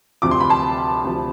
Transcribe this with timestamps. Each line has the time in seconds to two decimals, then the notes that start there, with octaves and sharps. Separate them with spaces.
0.22 D2 C3 F3 D6
0.31 C6
0.40 B5
0.50 A5 C6
1.04 D2 C3 F3